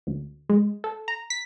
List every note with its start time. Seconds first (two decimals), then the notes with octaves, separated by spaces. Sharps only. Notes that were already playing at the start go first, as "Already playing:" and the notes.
0.07 D2
0.49 G#3
0.84 A4
1.08 A#5
1.30 B6